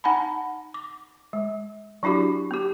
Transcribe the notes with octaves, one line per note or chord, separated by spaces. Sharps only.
D#4 F#5 G#5 A5 B5
D6
G#3
F#3 D4 E4 F#4 G4
B3 G4